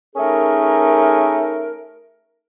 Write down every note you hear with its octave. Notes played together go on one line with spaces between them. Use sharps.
A3 C#4 D#4 G#4 A#4